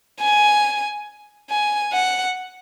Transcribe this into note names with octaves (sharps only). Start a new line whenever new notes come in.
G#5
G#5
F#5